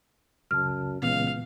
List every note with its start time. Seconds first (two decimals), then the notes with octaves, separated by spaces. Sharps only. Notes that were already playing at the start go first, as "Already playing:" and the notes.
0.51 C#2 F#2 C#3 A5 F6
1.02 C#2 A#2 E3 B3 F5